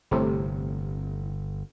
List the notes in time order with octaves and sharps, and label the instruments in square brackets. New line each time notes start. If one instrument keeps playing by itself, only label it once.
[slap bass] G1 [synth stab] A2 C3